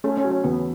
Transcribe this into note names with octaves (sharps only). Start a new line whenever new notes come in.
A3 C#4
C#4
F#3
C#4
E2 B3